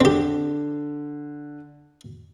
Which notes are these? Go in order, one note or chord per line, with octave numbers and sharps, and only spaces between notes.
D3 C4 G4